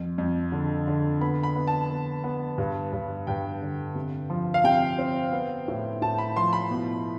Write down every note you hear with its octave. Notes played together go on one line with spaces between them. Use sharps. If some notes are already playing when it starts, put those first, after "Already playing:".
Already playing: F2
F2
D3
D3
B3 B5
B5
B3
A5
B3
B3
G2
G2
G2 G5
D3
C3
F3
F5
C3 G5
C4
B3
A2
A2 A5
B5
F3 C6
B5
B2